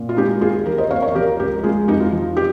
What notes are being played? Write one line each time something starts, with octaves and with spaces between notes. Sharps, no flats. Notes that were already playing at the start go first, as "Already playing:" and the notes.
Already playing: A#2
F4
G#3 D#4 G4
D#2 F4 G#4
F3 G4 A#4
C5 D#5
D#2 C#5 F5
A#4 C#5
F3 G4 A#4
C#2 G4 A#4
A#4
G#3 F4 G#4
F2 D#4 G4
F4
F3
G4